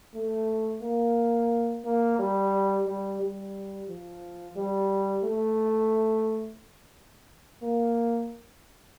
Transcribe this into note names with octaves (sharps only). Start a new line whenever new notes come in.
A3
A#3
A#3
G3
G3
G3
F3
G3
A3
A#3